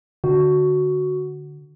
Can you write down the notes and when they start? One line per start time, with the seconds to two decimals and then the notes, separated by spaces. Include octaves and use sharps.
0.24 D3 F#4